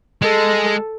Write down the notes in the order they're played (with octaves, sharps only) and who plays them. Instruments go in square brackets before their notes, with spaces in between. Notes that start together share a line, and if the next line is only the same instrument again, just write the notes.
[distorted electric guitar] G#3 [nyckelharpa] A4